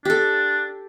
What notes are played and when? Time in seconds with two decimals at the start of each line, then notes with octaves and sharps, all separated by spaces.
0.05 D4 G4 A4